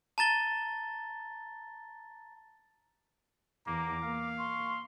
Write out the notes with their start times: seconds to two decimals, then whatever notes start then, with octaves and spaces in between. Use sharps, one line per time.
0.18 A5 A#5 A6 G7
3.67 E2 A#3 A#5 D6
4.03 A#3 F5
4.39 C6 C#6